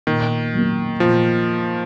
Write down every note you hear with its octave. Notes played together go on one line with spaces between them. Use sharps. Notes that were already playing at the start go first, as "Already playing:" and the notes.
A#2 D#3
F#3 A#3
A#2 F3